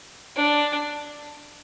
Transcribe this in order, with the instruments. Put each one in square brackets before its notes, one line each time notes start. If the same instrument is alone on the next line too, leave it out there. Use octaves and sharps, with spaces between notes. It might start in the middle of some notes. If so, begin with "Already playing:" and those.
[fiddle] D4